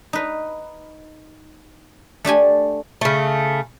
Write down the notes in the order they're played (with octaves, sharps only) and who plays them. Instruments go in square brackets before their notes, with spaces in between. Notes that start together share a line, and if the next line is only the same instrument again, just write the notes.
[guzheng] D#4 B4
A3 D4 G4 G#5
[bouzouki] C#3 A3